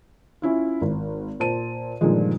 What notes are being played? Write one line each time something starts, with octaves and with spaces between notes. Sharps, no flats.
C#4 E4 F4
G#1
A#2 C5 A5 D#7
G2 A#2 D3 D#3 F3 G#3